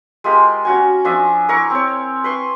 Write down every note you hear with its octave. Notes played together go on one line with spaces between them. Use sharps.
G#3 F4 G4 A#4
C#4 F#4 G#5
F3 D4 E5 G#5
E4 A#4 C#6
C4 C#5
B4 C6 C#6